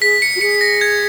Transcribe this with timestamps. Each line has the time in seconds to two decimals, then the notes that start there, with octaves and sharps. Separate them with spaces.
0.01 G#4 B6
0.22 C#7
0.36 F#4
0.41 G#4 C#7
0.61 A#6
0.81 G#6